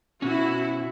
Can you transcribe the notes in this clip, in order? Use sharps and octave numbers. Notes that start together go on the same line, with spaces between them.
B2 C#4 E4 F#4